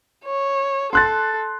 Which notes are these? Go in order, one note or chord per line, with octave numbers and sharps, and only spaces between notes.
C#5
A4 C6 F#6 A6